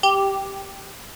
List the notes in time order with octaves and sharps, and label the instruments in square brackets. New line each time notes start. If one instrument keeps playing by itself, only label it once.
[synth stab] G4